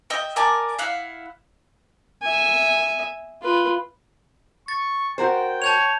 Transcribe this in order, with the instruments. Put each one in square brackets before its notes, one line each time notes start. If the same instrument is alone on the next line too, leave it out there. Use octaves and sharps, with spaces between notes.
[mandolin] D#5 E5 G5
A#4 D5 G#5 A5
E4 F5 F#5
[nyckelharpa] E5 G#5
F4 B4
[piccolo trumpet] C#6 [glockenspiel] A6
[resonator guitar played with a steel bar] F#4 A#4 C5 [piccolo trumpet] G5
[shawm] C#5 [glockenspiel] A5 G6 F7